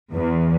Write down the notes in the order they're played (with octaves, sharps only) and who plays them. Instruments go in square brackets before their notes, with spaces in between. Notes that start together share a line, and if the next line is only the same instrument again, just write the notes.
[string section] E2